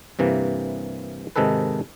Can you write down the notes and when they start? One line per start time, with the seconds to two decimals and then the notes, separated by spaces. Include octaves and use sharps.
0.19 G2 C3 E3 A#3
1.36 G#2 C3 D#3 G#4 A4 B4